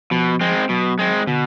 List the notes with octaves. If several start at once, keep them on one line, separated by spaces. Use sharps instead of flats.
B2 F3
G#3 C4
B2 F#3
G#3 C4
B2 D3